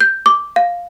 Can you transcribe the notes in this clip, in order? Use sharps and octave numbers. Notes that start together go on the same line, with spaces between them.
G6
D6
F5